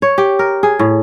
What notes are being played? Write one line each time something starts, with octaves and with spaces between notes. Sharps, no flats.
C#5
G4
A#4
G#4
A2